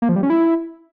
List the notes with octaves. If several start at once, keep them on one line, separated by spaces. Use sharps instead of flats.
A#3
F3
G3
C#4
E4